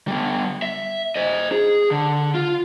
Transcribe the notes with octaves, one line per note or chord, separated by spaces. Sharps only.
G3 B3
E5
C5 D#5
G#4
D3
F4